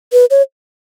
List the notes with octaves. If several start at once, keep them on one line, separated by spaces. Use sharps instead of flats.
B4
C#5